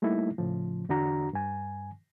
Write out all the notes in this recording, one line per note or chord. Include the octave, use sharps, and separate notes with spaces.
G3 A3 A#3 D#4 E4
A2 C#3 F3
E2 D3 D4 F#4 A#5
G2 G#5